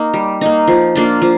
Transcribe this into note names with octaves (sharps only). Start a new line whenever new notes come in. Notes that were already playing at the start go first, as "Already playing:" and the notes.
Already playing: A#3 D#4
G3
A#3 D#4
F3
A#3 D4 F4
F3